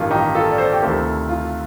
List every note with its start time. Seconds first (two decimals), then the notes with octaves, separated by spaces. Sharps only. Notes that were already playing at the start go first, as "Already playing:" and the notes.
Already playing: A1 G2 D#3 F4
0.11 D#4 G4
0.35 F4 A4
0.51 D5
0.58 A4 C5
0.73 G4
0.82 D2 C3 D#3 F4 A4
1.29 F4